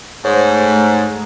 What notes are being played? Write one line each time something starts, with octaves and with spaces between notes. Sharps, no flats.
G#2 A3 C5 C#5